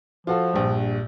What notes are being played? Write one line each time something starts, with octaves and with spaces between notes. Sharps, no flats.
F3 F4 F#4 A4
A#1 G2